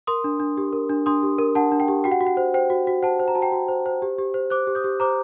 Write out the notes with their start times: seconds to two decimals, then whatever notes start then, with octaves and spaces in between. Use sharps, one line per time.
0.07 A#4 C6 D#6
0.24 D4
0.40 D4
0.57 G4
0.73 A#4
0.90 D4
1.06 D4 C6 D#6
1.23 G4
1.39 A#4
1.55 D4 F#5 A5
1.72 D4
1.80 G5
1.88 G4
2.04 F#4 G5
2.12 F#5
2.21 F#4
2.27 F#5
2.37 C5
2.54 C5 G5
2.70 F#4
2.87 F#4
3.03 C5 F#5 A5
3.20 C5
3.28 A#5
3.35 F#4 A5
3.42 G5 A#5
3.52 F#4
3.68 C5
3.86 C5
4.02 G4
4.18 G4
4.34 C5
4.50 C5 D6 F#6
4.67 G4
4.75 D#6 G6
4.84 G4
5.00 C5 A#5 D6